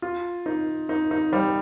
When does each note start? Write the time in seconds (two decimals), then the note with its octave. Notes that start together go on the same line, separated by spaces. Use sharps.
0.02 F4
0.46 D#4
0.89 D#4
1.11 D#4
1.33 G3